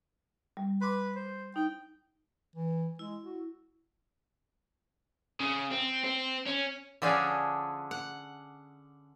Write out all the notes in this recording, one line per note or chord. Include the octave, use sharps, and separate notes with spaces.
G3
B4 C6 D6
C5
D#4 G5
E3
G#3 E4
F#4
C#3
C4
C4
C#4
D3 F3 C#4 D4 G#4
F#5